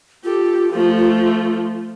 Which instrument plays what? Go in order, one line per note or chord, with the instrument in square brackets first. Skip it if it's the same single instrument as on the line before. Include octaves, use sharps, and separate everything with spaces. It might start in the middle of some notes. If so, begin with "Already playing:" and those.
[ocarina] F4 [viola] G4 A4
[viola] F3 A3